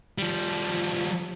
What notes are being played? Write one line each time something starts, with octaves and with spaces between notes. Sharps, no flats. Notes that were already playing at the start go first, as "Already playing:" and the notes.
F3 G3